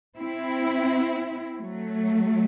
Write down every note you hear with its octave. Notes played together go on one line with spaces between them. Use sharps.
C4 E4
F#3 A3